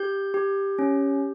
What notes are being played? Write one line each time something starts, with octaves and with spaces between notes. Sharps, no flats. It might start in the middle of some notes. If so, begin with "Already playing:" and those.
Already playing: G4 G6
G4
C#4